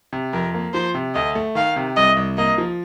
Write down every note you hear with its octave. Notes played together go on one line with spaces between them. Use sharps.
C3
F2 A#4
A#3
F3 C5
C3
D2 D#5
A3
D#3 F5
C3
C2 D#5
C2
A#3 D#5
F3